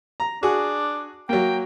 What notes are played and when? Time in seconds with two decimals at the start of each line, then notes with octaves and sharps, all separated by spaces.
0.20 A#5
0.43 D4 F#4 G#4
1.29 F#3 A#3 G5